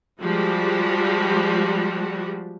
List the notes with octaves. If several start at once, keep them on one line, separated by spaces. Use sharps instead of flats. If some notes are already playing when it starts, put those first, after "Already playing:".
F3 G3 G#3 F#4 G4